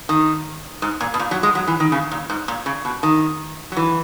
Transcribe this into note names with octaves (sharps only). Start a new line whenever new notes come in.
D#3
G#2
A#2
B2
A#2
F#3
G#3
F#3
E3
D#3
C#3
A#2
G#2
A#2
C#3
B2
D#3
F#3
E3